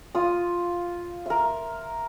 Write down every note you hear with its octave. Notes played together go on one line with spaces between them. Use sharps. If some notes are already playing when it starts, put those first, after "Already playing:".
F4 D#6
A#4 E5